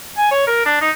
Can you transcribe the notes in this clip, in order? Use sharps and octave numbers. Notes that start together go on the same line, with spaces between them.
G#5
C#5
A#4
D4
D#4